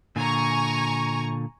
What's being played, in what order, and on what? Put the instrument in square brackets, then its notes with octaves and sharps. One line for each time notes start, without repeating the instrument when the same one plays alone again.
[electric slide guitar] A#2 D3 [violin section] G#5 A#5 C#6